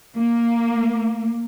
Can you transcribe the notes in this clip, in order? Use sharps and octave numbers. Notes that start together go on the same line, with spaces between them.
A#3